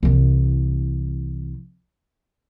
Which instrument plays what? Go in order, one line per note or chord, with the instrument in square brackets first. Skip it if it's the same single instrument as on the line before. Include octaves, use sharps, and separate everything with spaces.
[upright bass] C2 E3